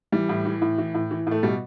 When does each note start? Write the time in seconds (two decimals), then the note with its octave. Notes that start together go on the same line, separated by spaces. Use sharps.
0.12 E3 G3
0.29 A2
0.45 E3
0.62 A2
0.78 E3
0.95 A2
1.11 E3
1.27 A2 A3
1.43 B2 G3